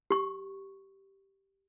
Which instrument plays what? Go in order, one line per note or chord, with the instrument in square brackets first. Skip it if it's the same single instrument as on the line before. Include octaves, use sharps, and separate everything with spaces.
[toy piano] G4 C#6